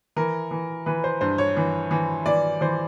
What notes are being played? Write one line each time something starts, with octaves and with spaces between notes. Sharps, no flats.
E3 A#4
E3
E3 B4
C5
G2 C5
C#5
E3
E3
E3 D5
E3 C5